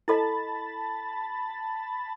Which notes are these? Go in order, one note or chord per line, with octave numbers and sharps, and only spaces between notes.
E4 A4 D#5 A5 B5 A6